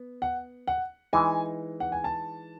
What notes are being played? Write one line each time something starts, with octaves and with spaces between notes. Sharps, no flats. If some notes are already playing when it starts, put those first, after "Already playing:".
Already playing: B3
F#5
F#5
E3 G#3 D#4 G#5
F#5
G#5
A5